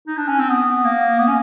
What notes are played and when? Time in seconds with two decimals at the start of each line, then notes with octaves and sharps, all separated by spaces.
0.07 D#4
0.17 D4
0.28 C#4
0.39 C4
0.50 B3
0.84 A#3
1.19 B3
1.28 C#4